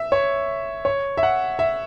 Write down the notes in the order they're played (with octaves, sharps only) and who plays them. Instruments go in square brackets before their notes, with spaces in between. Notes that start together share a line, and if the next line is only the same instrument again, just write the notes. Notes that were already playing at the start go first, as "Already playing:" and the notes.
Already playing: [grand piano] E5
C#5
C#5
E5
F#5
E5